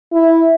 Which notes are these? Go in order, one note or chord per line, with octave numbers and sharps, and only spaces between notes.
E4